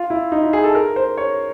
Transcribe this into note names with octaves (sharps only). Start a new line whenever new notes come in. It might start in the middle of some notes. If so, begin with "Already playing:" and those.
Already playing: F4
E4
D#4
E4
G#4
A4
A#4
C5
C#5